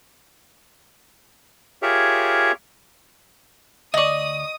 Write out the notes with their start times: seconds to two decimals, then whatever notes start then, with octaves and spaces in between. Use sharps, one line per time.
1.82 F4 G4 G#4 A#4 C#5 E5
3.94 D2 D5 D#5 C#6 D#6